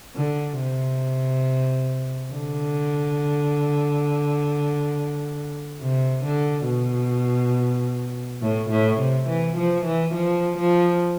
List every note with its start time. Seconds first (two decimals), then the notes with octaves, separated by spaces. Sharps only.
0.16 D3
0.60 C3
2.34 D3
5.81 C3
6.25 D3
6.68 B2
8.42 A2
8.70 A2
8.99 C3
9.28 E3
9.57 F3
9.86 E3
10.14 F3
10.58 F3